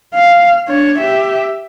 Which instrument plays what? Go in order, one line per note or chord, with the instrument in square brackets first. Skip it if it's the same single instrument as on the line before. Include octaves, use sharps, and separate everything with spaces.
[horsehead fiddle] F5
D4 C#5
G4 E5